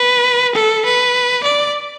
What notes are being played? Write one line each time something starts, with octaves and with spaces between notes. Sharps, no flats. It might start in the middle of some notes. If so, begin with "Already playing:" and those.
Already playing: B4
A4
B4
D5